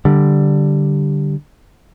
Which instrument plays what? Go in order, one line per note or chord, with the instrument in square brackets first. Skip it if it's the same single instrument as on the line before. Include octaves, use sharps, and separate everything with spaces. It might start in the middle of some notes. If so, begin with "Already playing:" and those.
[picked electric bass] D3 G3